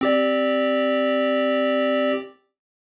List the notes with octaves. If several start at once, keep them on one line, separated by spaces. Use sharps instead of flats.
C4 G4 D5